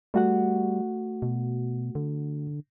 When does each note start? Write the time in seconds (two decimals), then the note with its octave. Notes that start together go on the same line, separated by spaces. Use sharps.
0.14 G3 A3 F#4 F#5
1.22 B2
1.95 D3